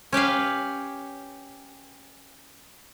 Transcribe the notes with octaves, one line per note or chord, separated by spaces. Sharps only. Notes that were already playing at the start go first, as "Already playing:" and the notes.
C#4 G4 B4 F5